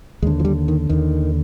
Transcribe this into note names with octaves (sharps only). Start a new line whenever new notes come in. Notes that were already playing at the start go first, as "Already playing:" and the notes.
D#2 D3 G#3
F3
G3
D#3
D#2 D3 D#3